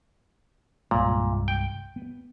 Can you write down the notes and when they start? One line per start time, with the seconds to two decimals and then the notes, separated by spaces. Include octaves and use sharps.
0.91 C2 G2 A#2 G#3
1.48 G5
1.96 B3